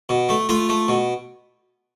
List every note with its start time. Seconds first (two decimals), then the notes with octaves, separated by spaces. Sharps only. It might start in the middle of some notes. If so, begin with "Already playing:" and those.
0.09 B2
0.29 A3
0.49 A3 F4
0.69 A3
0.88 B2